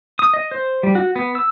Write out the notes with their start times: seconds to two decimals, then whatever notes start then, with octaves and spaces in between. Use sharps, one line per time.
0.19 D#6
0.34 D#5
0.51 C5
0.83 G3
0.95 F#4
1.16 B3
1.35 E6